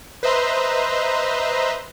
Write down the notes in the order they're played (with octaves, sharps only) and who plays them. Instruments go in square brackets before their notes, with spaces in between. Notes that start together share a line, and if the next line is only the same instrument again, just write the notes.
[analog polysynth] B4 C5 D#5 E5 A#5 C6